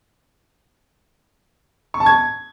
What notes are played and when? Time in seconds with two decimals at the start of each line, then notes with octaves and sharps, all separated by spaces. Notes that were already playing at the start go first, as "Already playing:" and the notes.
1.94 C#6
2.00 A5
2.06 G#6